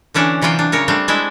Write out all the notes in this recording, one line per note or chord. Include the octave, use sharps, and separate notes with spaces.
D3 E3 C#4 D4
C3 E3 F#3 F4 G5
D4
C#3 A#4 C#5
G3 A3 C4 D4
G#3 D4 E4 E5